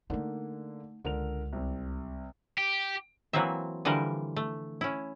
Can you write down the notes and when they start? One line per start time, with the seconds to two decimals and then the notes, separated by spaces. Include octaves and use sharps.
0.10 D3 A3 A#3 D#4
1.05 C#2 D3 A#4 F7
1.53 C2 C3
2.58 G4
3.33 E3 F#3 A#3 C4 E5
3.85 D3 E3 F3 G3 A#4
4.36 A3
4.81 C#4 E4